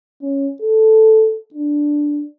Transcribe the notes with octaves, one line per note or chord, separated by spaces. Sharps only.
C#4
A4
D4